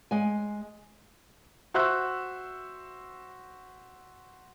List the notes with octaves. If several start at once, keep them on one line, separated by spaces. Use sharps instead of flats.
G#3 G#5
F#4 C5 E5 C#6 E6 F#6